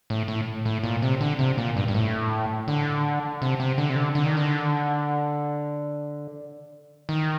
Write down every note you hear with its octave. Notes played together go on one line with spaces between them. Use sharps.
A2
A2
A2
A#2
C3
D3
C3
A#2
G2
G2
A2
D3
C3
C3
D3
C3
D3
D3
D#3
D3
D#3